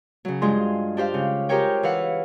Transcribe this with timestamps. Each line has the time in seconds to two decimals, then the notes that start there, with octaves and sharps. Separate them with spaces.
0.25 C#3 F#3
0.42 G2 G#3 F4 G#4 C6
0.97 D4 G4 C5 F5
1.14 C#3
1.49 G4 G#4 A#4 C5 C#5 G5
1.83 E3 B4 F5 F#5